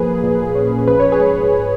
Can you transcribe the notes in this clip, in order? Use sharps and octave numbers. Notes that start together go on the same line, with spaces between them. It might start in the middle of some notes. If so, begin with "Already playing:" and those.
Already playing: F3 A#3 G#4 B4
A#2
C#4
F3 B4
C#5
G#4 B4
G#2